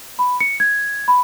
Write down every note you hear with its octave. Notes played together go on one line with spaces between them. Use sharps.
B5
C#7
G#6
B5